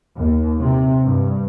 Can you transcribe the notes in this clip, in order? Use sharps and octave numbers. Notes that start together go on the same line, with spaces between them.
D#2
C3
G2